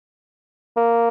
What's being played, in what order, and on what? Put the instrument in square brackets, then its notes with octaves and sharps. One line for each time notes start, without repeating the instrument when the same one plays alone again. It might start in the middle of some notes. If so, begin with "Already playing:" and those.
[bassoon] A#3